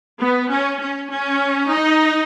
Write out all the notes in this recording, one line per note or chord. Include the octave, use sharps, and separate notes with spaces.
B3
C#4
C#4
C#4
D#4